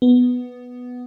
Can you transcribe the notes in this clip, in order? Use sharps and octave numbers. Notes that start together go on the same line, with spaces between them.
B3